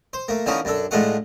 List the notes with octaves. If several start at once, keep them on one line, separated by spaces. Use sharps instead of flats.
C5
A3 A#3
D3 E3 F3 C#4 D#4 A#4
F#2 D4 A4
A2 D3 G#3 A3 F4 F#5